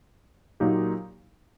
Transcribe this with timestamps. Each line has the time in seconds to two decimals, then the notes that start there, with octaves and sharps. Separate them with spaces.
0.60 A#2 F#3 A#3 D#4 G4